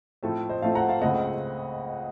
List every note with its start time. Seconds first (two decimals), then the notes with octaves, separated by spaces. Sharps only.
0.23 A2 F3 A3 C4 A4 C5
0.49 C5 D#5
0.62 A2 F3 A3 C4 F5 A5
0.75 F#5 A#5
0.89 F5 A5
1.01 C#2 C#3 A3 C4 D#5 F#5